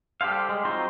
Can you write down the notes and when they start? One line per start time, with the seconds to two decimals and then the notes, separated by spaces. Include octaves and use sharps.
0.21 G3 G4 A4 C5 F5
0.49 G#3
0.65 F#3 C4 D#4 F4 C5